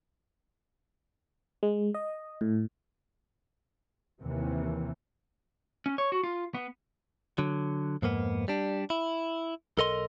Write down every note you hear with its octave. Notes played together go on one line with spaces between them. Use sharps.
G#3
D#5
A2
D#2 C3 E3
C#4
C#5
F#4
F4
B3
D3 F#3
F2 G#2 A#3 B3
G3 D4
E4
B1 A4 A#4 D#5 C6